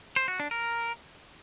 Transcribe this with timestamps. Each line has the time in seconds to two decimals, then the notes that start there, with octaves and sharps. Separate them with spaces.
0.16 C5
0.28 F#4
0.40 D4
0.51 A#4